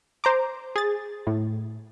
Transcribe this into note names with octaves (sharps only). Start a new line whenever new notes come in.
C5 A#5 D6
G#4 A6
A2